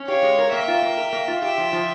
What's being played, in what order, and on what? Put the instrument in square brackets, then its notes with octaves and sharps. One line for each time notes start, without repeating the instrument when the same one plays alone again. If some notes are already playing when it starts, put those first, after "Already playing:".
Already playing: [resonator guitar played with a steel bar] C#4
[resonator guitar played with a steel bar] G4 [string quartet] C#5 F5
[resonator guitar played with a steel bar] G#3
A#4
[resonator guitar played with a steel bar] A#3 [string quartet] E5 G5
[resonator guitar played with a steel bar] F4
A#3
A#4
A#3
F4
[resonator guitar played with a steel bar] G4 [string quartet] E5 G5
[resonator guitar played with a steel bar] F3
F3